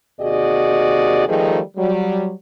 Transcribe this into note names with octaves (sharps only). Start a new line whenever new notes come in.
D#2 C3 F#4 G#4 D5 D#5
D#3 F3 G3 A3 D#4 G#4
F#3 G3